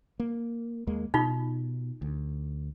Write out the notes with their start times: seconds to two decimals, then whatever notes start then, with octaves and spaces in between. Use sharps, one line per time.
0.20 A#3
0.87 D#2 G#3 A#3
1.14 B2 D#4 F4
2.02 D2